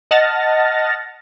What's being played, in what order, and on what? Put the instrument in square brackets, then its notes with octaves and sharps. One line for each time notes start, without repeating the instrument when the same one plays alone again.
[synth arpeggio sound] D#5 F#5 A5 F6 A6 A#6